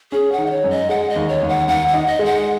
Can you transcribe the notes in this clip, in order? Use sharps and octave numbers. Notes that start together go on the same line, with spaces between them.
C#4 G#4
F#5
D#3
D#5
C#5
F#2
D#5
G#3 F#5
D#5
D#2
C#5
D#2
F#5
D#2 F#5
F#5
D#4
D#5
G#3
F#5